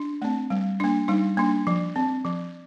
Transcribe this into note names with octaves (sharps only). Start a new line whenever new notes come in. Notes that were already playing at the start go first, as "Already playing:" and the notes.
Already playing: D4
A3 C4
G3
A#3 D4
G3 D#4
A#3 D4
F3
C4
F3